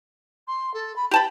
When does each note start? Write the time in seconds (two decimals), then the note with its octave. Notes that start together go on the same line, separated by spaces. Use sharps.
0.47 C6
0.73 A4
0.96 B5
1.11 G4 G5 A5 B5